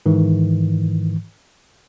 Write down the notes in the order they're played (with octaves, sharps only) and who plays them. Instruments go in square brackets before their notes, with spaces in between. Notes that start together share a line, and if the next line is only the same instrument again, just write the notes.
[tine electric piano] G#2 D#3 E3